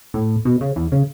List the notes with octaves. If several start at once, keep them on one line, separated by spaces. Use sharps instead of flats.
A2
B2
C#3
E2
C#3